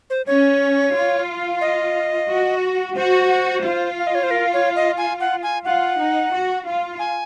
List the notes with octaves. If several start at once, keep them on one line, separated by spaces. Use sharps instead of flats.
C5
C#4 C#5
F4
D#5
F#4
F#4 C5
F4
F5
D#5
C#5
C5
A#4
C#5
D#5
G#5
F#5
G#5
F4 F#5
D#4
F#4
F4
G#5